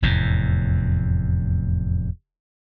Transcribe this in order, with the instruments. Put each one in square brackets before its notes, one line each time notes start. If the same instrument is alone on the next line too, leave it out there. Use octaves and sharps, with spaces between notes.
[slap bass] F1 E2 A2